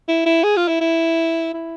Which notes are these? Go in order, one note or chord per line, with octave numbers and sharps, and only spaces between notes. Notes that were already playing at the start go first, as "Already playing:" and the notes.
E4
E4
G#4
F4
E4
E4
E4